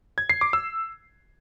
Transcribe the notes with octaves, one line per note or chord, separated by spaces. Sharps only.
G#6
C7
D6
E6